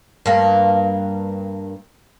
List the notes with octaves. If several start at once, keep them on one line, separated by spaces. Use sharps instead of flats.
G2 A#3